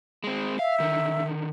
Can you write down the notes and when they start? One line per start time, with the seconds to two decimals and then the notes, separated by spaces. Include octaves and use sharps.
0.24 G#3 C4
0.59 E5 F5
0.80 D3 D#3